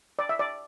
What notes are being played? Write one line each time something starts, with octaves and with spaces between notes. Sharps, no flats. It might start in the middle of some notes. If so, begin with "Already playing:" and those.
D5
E5
D5